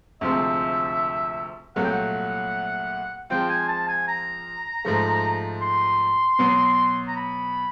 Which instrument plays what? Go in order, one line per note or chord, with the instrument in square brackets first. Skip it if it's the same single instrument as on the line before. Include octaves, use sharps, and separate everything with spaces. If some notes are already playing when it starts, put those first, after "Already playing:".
[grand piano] D2 C3 F3 G#3 C4 [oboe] E5
[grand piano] C2 A#2 F#3 A3 [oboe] F#5
[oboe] G5
F#5
[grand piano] F3 G#3 C4 F4 [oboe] G5
[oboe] G#5
A5
G#5
A#5
[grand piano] G#2 F3 A3
[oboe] C6
[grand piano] B2 F#3 B3
[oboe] A#5
B5